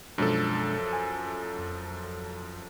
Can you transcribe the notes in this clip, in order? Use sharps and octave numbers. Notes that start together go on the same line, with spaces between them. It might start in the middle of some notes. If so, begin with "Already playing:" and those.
F#2 B2 F3 G#3 D4 A4
G#5
F2